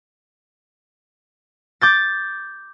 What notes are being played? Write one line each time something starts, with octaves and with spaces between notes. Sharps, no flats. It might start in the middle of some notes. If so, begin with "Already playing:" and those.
D6 G6 A6